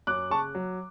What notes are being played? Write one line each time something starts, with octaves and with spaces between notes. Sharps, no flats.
F#2 D6 F#6
C#3 A5 C#6
F#3